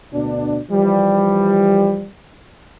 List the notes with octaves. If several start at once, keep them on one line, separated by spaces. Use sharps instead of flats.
D2 B2 D4
E3 F3 G3